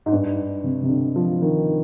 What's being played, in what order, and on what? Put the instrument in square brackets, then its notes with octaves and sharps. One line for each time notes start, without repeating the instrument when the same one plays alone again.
[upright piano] G#2
G2
C3
C3
D3
F3
D#3